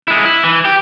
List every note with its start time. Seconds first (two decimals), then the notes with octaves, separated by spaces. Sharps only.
0.08 G#3 E4
0.25 E4
0.44 E3
0.65 G4